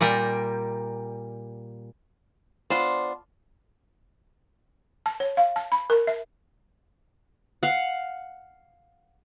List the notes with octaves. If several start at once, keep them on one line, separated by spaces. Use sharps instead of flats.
A#2 G3 A#4 G5
B3 D4 F4 C5
A5
C#5
F5
A5
B5
A#4
E5
F5 F#5